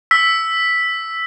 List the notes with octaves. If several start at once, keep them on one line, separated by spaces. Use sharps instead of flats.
E6 B6